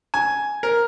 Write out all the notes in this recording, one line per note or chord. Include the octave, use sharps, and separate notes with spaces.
G#5
A#4